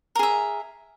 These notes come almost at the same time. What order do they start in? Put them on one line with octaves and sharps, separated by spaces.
A#4 G#4 E5